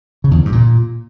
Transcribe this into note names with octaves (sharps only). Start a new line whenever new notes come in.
C#3
E2
F3
G2
A#2